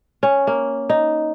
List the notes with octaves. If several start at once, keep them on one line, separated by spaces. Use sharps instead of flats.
C#4
A#3
D#4